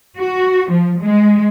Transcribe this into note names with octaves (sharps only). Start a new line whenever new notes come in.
F#4
F3
G#3